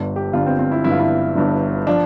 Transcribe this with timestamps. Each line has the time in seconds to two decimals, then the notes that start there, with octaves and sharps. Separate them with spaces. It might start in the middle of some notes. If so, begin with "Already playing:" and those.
Already playing: G1 G2 D3
0.16 G4
0.33 G1 G2 D3 F4
0.46 C4
0.59 C4
0.71 E4
0.84 G1 G2 D3 E4
0.92 F4
1.00 E4
1.35 G1 G2 D3
1.87 F3 D4